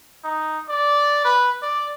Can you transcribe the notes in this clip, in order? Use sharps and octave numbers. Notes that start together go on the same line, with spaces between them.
D#4
D5
B4
D5